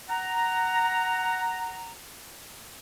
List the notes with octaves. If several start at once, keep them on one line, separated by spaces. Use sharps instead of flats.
F#5 A#5